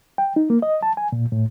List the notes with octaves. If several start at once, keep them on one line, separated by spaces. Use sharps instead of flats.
G5
D#4
A#3
D#5
A5
G#5
A#2
A2